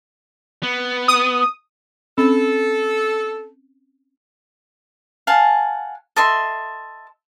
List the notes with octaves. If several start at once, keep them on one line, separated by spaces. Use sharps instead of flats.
B3
D#6
C4 C#4 A4 B5
F5 F#5 G#5 A5
A4 D#5 E5 C6